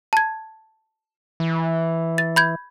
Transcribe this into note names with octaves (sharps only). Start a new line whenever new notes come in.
A5 G#6
E3
A6
B5 G6 G#6